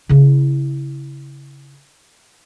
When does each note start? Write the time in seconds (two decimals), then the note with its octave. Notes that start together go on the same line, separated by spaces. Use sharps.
0.09 C#3 E4